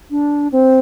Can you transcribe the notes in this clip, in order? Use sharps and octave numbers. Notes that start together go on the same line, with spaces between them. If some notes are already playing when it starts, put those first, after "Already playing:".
D4
C4